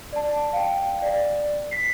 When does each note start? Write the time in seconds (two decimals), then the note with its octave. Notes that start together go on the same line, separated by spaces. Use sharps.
0.13 D5 A5
0.53 F5 G5
1.02 D5
1.71 B6 C7